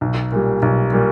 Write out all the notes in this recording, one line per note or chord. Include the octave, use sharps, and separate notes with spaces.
B1
A#2 G3
B1
A#2 G3